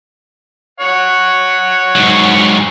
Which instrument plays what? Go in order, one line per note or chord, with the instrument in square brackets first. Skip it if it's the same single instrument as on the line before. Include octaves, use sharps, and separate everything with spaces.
[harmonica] C#5 F#5
[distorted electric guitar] G#2 F#3